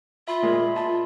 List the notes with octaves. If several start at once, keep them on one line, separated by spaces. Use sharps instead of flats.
F4 E5 B5 C6
A#2 G#3 A#3
F4 A5